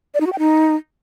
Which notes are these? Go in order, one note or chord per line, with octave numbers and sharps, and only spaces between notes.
D5
D#4
F#4
G5
D#4